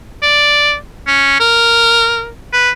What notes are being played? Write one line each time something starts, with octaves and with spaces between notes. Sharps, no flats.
D5
C#4
A#4
B4